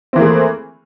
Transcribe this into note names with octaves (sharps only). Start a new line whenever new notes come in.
E3 A3 A#3 C4 G#4